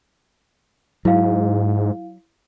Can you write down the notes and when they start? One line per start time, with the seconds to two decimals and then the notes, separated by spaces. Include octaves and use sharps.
1.05 G#2 F#3 E4 F5